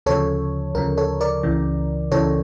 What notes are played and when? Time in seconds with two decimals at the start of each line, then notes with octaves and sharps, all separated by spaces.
0.06 D2 C#3 F3 A4 C#5
0.75 D2 C#3 F3 A#4
0.97 A4 C#5
1.21 A#4 D5
1.43 C#2 C#3 E3
2.12 C#2 C#3 E3 A4 C#5